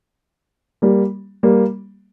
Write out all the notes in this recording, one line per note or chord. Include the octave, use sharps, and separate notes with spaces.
G3 A#3
G3 A#3